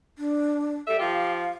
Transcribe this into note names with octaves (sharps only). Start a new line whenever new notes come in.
D4
G3 A4 E5
F3 F4 G4 F5